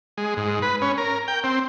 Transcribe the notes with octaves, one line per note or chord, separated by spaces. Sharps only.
G#3
G#2
B4
C#4
A#4
G5
C4